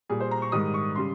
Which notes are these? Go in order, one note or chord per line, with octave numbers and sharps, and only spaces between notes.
A#2 G3 G#4
C5
A#5
C#6
G#2 D#3 G3 D#6
C#6
C#3 G3 C6